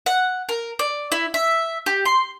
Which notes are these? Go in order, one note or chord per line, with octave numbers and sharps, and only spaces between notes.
F#5
A#4
D5
E4
E5
G4
C6